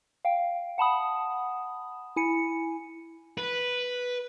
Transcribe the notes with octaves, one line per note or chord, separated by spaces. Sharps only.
F5 G5
F#5 A5 B5 D#6
E4 G#5 C#7
B4